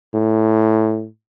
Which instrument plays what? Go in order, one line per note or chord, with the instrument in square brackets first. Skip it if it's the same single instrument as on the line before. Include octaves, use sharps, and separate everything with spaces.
[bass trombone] A2